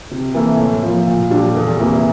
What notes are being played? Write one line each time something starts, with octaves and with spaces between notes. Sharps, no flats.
C3
E3 A#3 E4 A4
A2
F3
A#3
A#2
G3 D4 A4
E2
C3 E3 A#3 E4